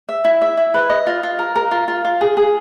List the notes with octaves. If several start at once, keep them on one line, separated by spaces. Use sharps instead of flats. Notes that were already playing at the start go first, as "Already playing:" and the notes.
E5
E4
E5
E4
B4
D#5
F4
F4
A#4
A#4
F4
F4
F4
G#4
G#4